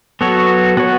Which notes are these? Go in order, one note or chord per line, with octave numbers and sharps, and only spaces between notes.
F#3 B3 F#4 A4 C#5
B3 F#4 C#5